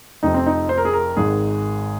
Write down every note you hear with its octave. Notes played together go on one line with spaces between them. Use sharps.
F1 F2 C3 F3 D#4
C4
D#4
C5
A#4
G#4
A#4
G#1 G#2 D#3 G#4